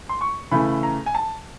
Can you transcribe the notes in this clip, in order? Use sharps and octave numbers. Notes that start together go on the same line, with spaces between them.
C6
C#6
C#3 E3 A3 B5
A#5
G#5
A5